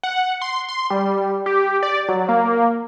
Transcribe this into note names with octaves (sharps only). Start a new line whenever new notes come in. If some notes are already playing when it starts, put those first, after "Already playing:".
F#5
C6
C6
G3
G4
D5
F#3
A#3